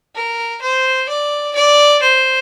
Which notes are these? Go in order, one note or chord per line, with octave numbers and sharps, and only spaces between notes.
A#4
C5
D5
D5
C5